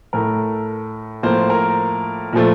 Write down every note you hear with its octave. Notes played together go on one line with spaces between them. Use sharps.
A2 A3 A#4
A2 F3 A#3 C5
A#4
A#2 F3 A3